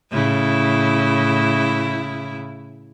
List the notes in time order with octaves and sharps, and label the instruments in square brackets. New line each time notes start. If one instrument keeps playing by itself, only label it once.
[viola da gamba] A2 C#3 E4